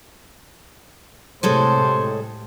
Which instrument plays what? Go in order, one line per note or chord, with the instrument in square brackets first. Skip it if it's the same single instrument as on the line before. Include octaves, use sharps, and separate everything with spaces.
[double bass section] A2 C3 [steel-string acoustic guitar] G#3 A4 C#5 [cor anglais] C5